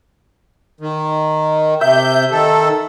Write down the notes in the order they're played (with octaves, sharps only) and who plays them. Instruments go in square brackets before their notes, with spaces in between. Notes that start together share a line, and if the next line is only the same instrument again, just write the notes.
[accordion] D#3
[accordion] C3 G6 [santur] E5
[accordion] D#3 A4